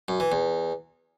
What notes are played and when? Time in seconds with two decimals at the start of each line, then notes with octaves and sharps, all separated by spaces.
0.08 F#2
0.20 E3
0.32 E2